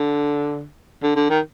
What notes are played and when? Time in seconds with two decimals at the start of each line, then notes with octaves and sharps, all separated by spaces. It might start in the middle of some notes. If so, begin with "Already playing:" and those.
Already playing: D3
1.03 D3
1.16 D3
1.30 D#3